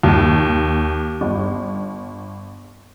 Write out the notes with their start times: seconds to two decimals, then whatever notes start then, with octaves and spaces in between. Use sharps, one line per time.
0.03 D#2
1.21 G1